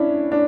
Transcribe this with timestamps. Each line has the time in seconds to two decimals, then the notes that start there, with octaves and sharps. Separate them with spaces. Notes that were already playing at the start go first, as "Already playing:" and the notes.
Already playing: C#4 D4 E4
0.32 D4